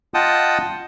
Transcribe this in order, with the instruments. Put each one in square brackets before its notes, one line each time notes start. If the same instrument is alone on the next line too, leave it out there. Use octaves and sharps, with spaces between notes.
[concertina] F4 D#5 F#5 G5 A5 D#6